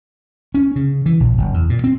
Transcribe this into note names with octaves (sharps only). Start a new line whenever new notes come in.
C#4
C#3
E3
A#1
F#1
E2
A#2
C4